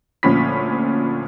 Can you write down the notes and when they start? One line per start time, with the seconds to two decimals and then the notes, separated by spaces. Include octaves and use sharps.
0.23 D2 A#2 F3 C#4 B5 B6